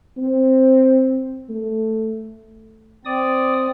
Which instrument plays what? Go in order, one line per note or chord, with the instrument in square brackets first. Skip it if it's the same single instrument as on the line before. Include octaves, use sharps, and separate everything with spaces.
[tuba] C4
A3
[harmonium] C4 [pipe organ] D5 D#6